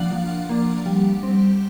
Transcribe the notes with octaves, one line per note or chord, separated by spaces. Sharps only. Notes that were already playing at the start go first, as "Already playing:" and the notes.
Already playing: F3 A#3 D4 F5 F#5
F3
A#3 D4
G3
C4